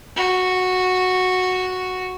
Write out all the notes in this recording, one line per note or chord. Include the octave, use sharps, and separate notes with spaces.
F#4